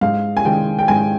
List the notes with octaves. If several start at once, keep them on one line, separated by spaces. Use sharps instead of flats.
G#2 F5
G#5
D#3 G#3 G5
G5
G#2 G#5